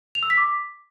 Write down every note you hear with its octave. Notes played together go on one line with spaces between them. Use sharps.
F7
E6
B6
D6